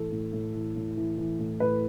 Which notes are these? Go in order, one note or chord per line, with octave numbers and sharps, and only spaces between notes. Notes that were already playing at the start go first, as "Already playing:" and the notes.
Already playing: A2 E3 A4
A2
A2
E3
A2
E3
E3
A2
A2 B4